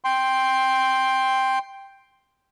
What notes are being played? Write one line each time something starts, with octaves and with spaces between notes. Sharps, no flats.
G5 C6